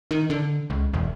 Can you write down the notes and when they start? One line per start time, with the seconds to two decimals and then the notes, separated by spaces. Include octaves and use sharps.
0.11 D#3
0.30 D3
0.70 C#2
0.94 E1